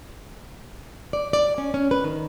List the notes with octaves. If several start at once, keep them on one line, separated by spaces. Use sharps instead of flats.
D5
D5
C#4
C#4
B4
D#3